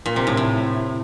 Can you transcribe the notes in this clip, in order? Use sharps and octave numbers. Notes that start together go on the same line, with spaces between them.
A#2
C3
A2
A2